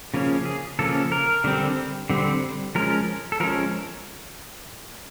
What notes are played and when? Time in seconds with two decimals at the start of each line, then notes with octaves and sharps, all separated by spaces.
0.14 C#3 F3 A#3 C#4
0.45 G#4
0.79 C#3 F3 A#3 C#4 A4
1.12 A#4
1.44 D3 G3 C4
2.10 D3 G3 C4
2.75 F3 G#3 C#4 A#4
3.32 A4
3.40 F3 G#3 C#4 A#4